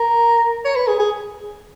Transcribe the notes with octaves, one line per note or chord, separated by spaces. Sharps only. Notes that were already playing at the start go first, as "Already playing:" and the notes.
Already playing: A#4
C#5
B4
G#4
G#4